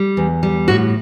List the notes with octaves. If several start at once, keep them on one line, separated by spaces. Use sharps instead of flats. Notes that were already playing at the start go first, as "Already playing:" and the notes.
Already playing: G3
E2
G3
A2 F#4